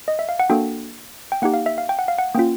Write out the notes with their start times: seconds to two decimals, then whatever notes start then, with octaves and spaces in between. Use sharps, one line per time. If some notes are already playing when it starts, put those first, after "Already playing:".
0.08 D#5
0.19 E5
0.29 F5
0.40 F#5
0.50 A#3 D4 F#4 A4 G5
1.32 G5
1.42 A#3 D#4 G4 F#5
1.54 F5
1.66 E5
1.78 F5
1.89 G5
1.99 F#5
2.08 F5
2.18 F#5
2.35 A#3 C#4 F4 G5